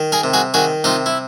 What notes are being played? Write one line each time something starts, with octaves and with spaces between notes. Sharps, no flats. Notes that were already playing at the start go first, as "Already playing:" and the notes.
Already playing: D#3
G#4 A#4
C3
F#4 G#4
D#3 F#4 G#4
C3 D#4 F4
E4